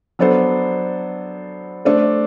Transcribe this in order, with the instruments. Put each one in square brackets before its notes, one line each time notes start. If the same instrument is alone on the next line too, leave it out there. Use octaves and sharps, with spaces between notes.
[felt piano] F#3 B3 D4 A4 C5
A3 D4 A4 C5